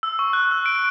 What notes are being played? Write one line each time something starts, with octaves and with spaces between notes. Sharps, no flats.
E6
C#6
F#6
E6
D7